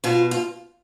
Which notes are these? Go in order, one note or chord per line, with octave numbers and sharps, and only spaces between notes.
B2 F4
F4